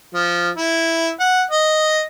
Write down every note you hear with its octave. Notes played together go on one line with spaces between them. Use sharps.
F3
E4
F#5
D#5